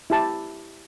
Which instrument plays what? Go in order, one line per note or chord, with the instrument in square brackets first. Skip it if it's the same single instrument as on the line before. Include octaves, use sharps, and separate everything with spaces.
[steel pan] E4 G4 A5